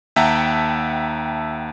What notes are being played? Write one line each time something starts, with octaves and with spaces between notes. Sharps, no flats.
D#2 E5 F#5 G5 A5 A#5